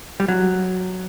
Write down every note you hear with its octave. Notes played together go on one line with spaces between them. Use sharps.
G3
F#3